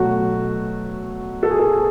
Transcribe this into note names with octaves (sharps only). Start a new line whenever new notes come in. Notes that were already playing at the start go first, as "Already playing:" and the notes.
Already playing: B2 F#3 A3 F#4
A4
G#4
A4
G#4